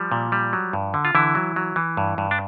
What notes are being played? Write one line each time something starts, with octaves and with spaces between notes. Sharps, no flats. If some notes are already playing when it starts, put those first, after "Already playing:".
Already playing: F3 G3
A#2
G3
F#3
G2
D3
F4
D3 E3 E4
F#3
F#3
E3
G2
G2
D4